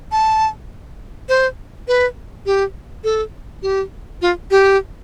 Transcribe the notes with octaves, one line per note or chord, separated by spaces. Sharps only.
A5
C5
B4
G4
A4
G4
F4
G4